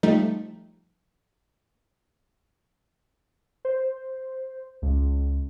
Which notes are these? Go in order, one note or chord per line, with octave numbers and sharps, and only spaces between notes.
F3 G3 A3 D#4
C5
C#2